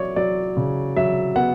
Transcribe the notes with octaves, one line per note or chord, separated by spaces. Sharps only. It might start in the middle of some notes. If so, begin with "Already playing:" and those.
Already playing: F#3 E4 C#5 D5
F#3 D5
C#3
F#3 E5
B3 F#5